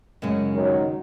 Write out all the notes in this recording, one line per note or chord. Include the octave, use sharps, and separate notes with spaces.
F#2 C#3 G#3
D#3 F#3